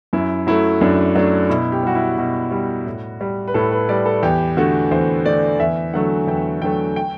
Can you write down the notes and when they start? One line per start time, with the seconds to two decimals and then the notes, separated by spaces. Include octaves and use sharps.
0.13 F#2 E4
0.47 F#3 A3 E4
0.81 F#2 D4
1.15 F#3 A3 D4
1.49 B2 E4
1.72 G4
1.83 G3 F#4
1.95 E4
2.18 B2 F#4
2.51 G3
2.86 A2
3.21 G3
3.48 B4
3.54 A2 A4
3.72 B4
3.89 G3 D5
4.06 A4
4.23 E2 G4
4.57 D3 A3 F#4
4.91 E2 C5
5.25 D3 A3 D5
5.60 E2 E5
5.93 D3 F#3 A3 F#5
6.27 E2 G5
6.62 D3 F#3 A3 G5
6.96 G5